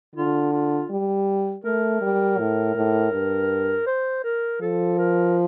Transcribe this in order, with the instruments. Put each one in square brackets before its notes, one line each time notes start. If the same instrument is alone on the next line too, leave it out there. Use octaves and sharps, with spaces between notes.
[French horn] D3 [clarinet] F4
[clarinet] F4
[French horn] G3
[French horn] A3 [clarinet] A#4
[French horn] G3
A2
A2
G2
[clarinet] C5
A#4
[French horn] F3 [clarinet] A4
[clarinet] A#4